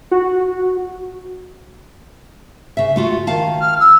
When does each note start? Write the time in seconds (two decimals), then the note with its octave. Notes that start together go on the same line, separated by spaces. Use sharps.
0.11 F#4
2.77 C#3 E5
2.96 A3 F4 F#4
3.27 D#3 F5 A5
3.61 F6
3.80 E6